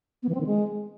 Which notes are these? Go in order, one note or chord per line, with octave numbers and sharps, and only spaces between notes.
B3
E3
C4
D#3
G#3